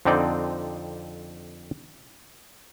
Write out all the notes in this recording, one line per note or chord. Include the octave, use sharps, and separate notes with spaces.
F2 D3 C4 D#4 D5 G5